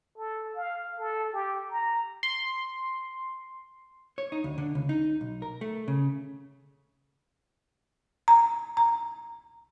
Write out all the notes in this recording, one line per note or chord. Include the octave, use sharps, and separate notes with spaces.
A4
F5
A4
G4
A#5
C6
C#5
D#4
D2
D3
C#2
D#4
B1
A#4
A3
C#3
A#5
A#5